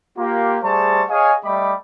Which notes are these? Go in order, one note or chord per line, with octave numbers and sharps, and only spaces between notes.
A#3 F4 G4
G3 A3 G#4 C5 A5 C#6
G#4 C#5 D#5 F5 G#5
G3 A3 G4 D#5 B5 D6